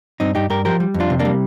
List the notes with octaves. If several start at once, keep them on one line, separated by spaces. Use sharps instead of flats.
G2 C4 D#4
G2 D#4 G4
G2 G4 A#4
F3 G4 A#4
G3
F2
D4 F4
C3
A#3 D4
G3